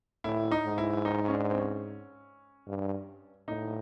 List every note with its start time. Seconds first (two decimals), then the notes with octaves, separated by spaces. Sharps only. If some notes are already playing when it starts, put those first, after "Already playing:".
0.24 A2 E4
0.51 D#4
0.65 G#2
0.78 E4
1.05 D#4
1.28 C#4
1.32 D4
1.51 C4
1.59 C#4
2.67 G2
3.48 A2 D#4